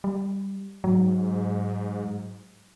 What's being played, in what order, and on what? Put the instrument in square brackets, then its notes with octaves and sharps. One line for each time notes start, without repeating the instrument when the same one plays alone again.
[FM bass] G3
[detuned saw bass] G#2 [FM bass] F#3